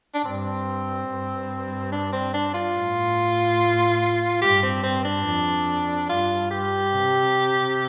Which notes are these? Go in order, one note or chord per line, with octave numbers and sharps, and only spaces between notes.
D4
G2 C4
G2
D4
C4
D4
F4
A2
G2 G4
C4
C4
D4
F2
G2 F4
G4
C3